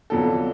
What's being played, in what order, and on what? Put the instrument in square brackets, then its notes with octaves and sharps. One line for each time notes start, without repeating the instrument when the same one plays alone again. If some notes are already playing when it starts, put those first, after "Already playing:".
[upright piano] F2 D3 F#3 B3 A4